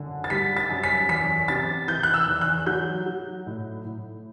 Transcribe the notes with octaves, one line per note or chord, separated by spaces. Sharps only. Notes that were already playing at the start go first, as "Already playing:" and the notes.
Already playing: F#2 D3
A6
G3 B6
A6
F#2
B6
E2 B6
C3 A6
E3 G6
F#6
E6
E2
F#6
F#3 G6
F#3
A2
A2